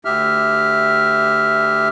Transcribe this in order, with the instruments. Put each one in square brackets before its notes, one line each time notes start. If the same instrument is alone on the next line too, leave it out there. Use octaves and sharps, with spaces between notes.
[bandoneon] D2 G4 E5 F6